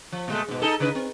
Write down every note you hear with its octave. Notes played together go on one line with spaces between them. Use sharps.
F3
A#2 G#3 A3
G#2 B2
D#4 G#4 A4
C#3 D#4 B4
C4